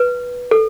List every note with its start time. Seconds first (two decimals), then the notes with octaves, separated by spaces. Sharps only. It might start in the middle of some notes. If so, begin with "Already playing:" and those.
Already playing: B4
0.51 A4